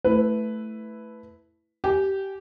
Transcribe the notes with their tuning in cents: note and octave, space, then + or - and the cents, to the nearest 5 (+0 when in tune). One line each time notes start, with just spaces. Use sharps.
A3 +0 E4 +0 B4 +5
G4 -15 G#5 +0